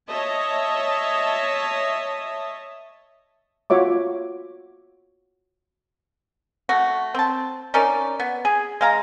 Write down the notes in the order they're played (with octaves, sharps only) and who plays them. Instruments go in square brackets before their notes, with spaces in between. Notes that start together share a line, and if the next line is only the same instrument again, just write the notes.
[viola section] C#5 D#5 E5 A5
[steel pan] F4 F#4 C#5 E5 D6
[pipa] A3 F#4
C4 A5
C#4 D#4 A#4 D5
B3
G#4
G#3 F5 A#5